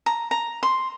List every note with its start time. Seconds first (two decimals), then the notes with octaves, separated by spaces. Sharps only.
0.06 A#5
0.31 A#5
0.63 C6